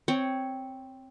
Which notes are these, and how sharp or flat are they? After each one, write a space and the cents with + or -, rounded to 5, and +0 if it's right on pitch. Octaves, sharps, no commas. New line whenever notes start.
C4 +0 C#5 +0